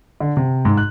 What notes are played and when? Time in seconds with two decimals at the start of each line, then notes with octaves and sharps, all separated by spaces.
0.20 D3
0.37 C3
0.65 G#2
0.77 F#6